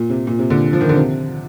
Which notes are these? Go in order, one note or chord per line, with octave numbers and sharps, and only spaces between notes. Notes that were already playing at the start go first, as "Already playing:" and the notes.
Already playing: A#2
C3
A#2
C3
A#2 D3
F3
D#3
D3
C3